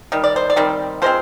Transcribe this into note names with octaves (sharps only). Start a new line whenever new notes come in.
D#3 G3
D5
C5
D5
D#3 G3 C4
F3 G#3 C4 C5